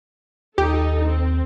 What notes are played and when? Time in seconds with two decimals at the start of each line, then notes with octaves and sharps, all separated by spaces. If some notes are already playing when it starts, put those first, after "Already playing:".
0.58 D#2 D#4 G4 A4
1.07 C4